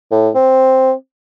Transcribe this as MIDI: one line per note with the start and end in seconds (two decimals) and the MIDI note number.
0.12 0.29 45
0.35 0.92 60